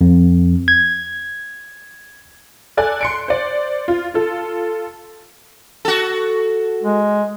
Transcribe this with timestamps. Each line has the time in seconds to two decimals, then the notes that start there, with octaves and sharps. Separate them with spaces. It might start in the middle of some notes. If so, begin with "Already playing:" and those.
0.01 F2
0.68 G#6
2.77 A4 D5 G#5 F#6
3.01 C6 C#7 D7
3.28 C5 D5
3.88 F4
4.14 F4 A4
5.85 F#4 A4
6.83 G#3